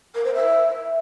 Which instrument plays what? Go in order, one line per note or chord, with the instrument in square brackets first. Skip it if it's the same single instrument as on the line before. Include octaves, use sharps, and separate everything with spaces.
[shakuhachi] A#4
C5
E5